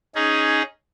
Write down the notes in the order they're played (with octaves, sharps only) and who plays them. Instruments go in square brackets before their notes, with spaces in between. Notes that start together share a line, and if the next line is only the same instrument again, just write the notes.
[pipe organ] C#4 D#4 G#4